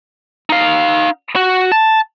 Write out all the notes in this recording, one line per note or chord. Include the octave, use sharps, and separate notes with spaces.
D#4 F5
F#4
A5